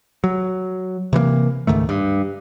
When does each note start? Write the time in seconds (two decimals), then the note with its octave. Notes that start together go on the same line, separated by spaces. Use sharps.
0.24 F#3
1.13 C3 E3 G#3 A#3
1.67 C#2 G#2 D#3 A3
1.89 G2